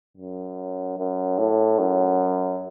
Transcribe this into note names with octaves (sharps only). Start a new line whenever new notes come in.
F#2
F#2
A2
F#2